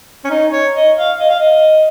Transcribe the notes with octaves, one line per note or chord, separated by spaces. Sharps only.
C#4
D#4
C#5
D#5
F5
D#5
F5
D#5